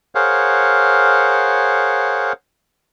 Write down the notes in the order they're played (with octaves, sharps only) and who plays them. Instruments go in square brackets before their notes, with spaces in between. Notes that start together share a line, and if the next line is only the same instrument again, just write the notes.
[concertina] G#4 A#4 C5 C#5 F5 F#5